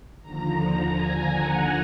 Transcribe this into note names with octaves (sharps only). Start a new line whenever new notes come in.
D#2 D3 F3 A#5
A#5
G#5
F#5